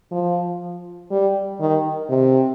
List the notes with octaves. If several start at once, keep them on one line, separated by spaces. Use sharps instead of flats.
F3
G3
D#3
C3